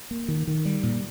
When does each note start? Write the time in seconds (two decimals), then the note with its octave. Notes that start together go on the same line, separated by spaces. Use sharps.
0.11 A#3
0.28 D#3
0.47 D#3
0.65 G3
0.83 A#2